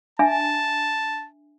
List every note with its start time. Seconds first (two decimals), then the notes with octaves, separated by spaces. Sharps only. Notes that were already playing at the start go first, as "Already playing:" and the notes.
0.19 D4 E5 G#5 A5